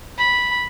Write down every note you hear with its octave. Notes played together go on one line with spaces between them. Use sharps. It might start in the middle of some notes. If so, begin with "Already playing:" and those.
B5